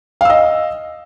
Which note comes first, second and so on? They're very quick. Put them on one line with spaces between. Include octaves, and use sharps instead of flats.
F5 E6 D#5